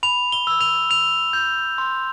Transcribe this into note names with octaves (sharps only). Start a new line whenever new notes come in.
B5 F7
G7
E6
F7
E6 F7
G6
C6